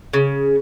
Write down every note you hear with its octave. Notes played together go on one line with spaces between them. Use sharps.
C#3